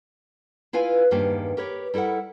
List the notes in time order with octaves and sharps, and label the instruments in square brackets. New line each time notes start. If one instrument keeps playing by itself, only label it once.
[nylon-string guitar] E4 F4 B4 F5 G#5
E2 G2 D#3 A#3 G4 C5
G4 A#4 B4 C#5
G3 E4 A4 A#4 F#5